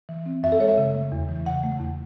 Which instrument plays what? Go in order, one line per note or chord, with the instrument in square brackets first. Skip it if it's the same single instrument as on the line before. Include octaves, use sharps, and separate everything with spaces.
[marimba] E3
C4
F#2 E5
A4
G#3 C#5
E5
C#3
A3
E2
E3
C#3 F#5
A3
E2